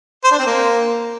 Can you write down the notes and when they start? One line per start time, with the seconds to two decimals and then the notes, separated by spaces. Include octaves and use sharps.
0.24 C5
0.31 D4
0.39 C4
0.46 A#3